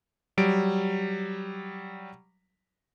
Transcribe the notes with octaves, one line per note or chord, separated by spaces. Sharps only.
F#3 G3 D7